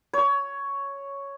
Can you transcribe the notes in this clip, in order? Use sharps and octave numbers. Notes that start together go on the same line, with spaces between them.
C#5